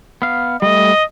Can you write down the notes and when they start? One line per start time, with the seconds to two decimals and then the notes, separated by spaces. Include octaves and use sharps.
0.22 B3 F5
0.62 G3 A3 D#5